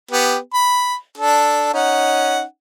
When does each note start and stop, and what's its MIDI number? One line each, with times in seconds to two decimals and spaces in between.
0.11 0.37 59
0.11 0.37 67
0.54 0.95 83
1.18 1.69 62
1.18 1.69 69
1.74 2.43 61
1.74 2.43 63
1.74 2.43 78